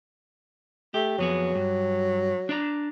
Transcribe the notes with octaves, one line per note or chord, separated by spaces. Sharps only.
A3 G4
F2 F#3 B3 G#4
G2
D4 D5 A#5